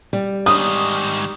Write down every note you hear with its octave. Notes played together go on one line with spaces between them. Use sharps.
G3
G#2 D#3 D#6